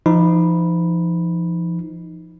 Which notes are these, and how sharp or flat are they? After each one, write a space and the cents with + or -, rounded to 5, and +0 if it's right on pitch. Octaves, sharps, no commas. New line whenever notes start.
F3 -35 D#4 +0 B5 -5